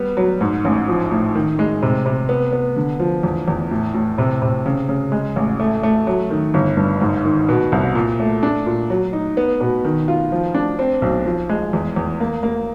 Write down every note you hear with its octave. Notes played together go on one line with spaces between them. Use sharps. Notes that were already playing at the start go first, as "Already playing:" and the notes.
Already playing: G3 B3
F#3
G#2
A1
F3
A2
D#3
G#3
C3
C3
B3
B3
D3
F3
E2
E2
A2
A2
C3
C3
C#3
C#3
G#3
A1
A3
A3
F#3
D#3
G1
G2
G#2
D#3
B2
C2
A#2
A3
D4
A#2
F#3
D#4
B3
B2
D#3
F4
F3
D4
C4
B1
F3
G#3
E2
E2
A#3
A#3